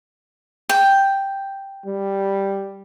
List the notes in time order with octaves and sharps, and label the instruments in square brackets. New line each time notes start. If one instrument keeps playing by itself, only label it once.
[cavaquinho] G5
[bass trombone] G3